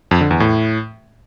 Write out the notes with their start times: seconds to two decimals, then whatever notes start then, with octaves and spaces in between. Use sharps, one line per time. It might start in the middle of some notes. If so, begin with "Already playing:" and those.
0.11 F2
0.21 D3
0.31 E2
0.40 A2